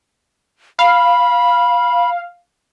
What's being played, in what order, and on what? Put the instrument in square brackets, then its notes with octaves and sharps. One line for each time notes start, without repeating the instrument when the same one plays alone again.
[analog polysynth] F5 [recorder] B5